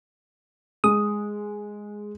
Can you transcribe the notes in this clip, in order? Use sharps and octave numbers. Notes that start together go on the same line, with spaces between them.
G#3 D#6